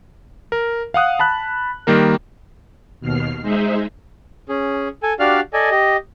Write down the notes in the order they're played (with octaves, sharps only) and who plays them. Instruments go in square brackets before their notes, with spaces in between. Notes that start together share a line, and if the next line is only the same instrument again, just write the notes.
[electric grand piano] A#4
F5 F#5 D#6 F#6
A5 B5 F#6
D#3 G3 A#3 A#4
[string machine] D#2 B2 F6 C7
G#3 D#4 G#4 C5 E5
[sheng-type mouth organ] C#4 G#4
A4 G#5
D4 F#4 G4 D5 F5 F6
A4 D5 D#5 G#5
G4 D#5